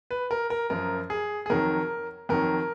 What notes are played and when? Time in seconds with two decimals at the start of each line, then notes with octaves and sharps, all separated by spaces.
0.11 B4
0.31 A#4
0.50 A#4
0.70 F#2 F3 A#4
1.10 G#4
1.46 G#4
1.50 F2 D#3 F#3 A#4
2.29 F2 D#3 F#3 A#4